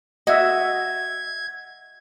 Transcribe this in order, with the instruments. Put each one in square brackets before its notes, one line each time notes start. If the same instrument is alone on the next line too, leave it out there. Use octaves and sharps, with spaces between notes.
[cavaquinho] F#4 [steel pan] D#5 E5 [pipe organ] G#6